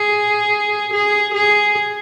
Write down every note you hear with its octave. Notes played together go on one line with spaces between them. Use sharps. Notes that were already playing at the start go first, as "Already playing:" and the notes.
Already playing: G#4
G#4
G#4